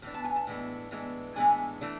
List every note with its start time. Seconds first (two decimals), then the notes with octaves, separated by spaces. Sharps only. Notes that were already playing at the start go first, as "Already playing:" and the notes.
0.02 A2 E3 B3 D4
0.14 A5
0.25 G#5
0.36 A5
0.47 A2 E3 G#3 B3 D4
0.91 A2 E3 G#3 B3 D4
1.36 A2 E3 G#3 B3 D4 G#5
1.81 E3 A3 D4